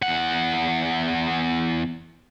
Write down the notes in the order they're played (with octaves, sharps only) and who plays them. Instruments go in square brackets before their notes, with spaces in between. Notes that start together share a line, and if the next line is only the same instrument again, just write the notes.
[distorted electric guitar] E2 F#5